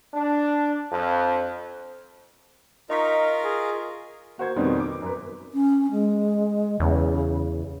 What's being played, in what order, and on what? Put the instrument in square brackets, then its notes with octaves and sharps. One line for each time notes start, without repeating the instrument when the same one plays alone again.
[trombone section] D4
F2
[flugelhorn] D#4 [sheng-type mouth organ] F4 A#4 [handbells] D#5 C#6 B6
[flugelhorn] G#4
[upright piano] A#3 F#4 C5 G#6
F2 B2 D#3 G3 B3 C4
D6
F#2 B4
[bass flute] C#4
G#3
[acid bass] E2 [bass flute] C#3